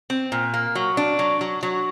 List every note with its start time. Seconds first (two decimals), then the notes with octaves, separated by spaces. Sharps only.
0.10 C4
0.32 A#2
0.54 A#3
0.75 F#3
0.97 D4
1.19 F#3
1.41 F#3
1.63 F#3